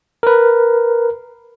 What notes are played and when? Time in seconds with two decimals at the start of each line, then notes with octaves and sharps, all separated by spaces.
0.23 A#4 B4